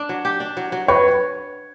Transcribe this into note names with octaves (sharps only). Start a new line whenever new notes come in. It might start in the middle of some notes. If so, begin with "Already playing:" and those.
Already playing: D4
F#3
G4
D4
F#3
F#3
F#3 B4 C#5